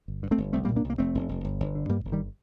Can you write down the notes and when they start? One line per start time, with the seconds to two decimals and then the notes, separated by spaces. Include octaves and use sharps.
0.08 G1
0.23 G2
0.31 A3 C4
0.38 G1
0.53 C2 A3 C4
0.65 G3 A#3
0.68 A#2
0.76 A#3 D4
0.84 C2
0.90 A#3
0.98 F1 A3 C4
1.15 F1
1.29 F1
1.44 G1
1.60 G1
1.75 D3
1.89 G2 G3 A#3
2.05 G1
2.12 D#3 G3